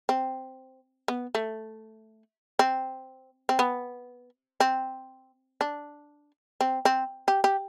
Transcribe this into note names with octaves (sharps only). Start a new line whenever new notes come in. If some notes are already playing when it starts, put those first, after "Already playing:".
C4
B3
A3
C4
C4
B3
C4
D4
C4
C4
G4
G4